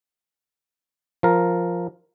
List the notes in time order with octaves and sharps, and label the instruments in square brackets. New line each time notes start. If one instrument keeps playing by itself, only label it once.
[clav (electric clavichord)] F3 A#4